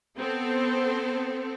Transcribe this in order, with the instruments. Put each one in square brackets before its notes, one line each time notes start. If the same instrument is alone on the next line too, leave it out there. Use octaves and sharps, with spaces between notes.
[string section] B3 C4 A4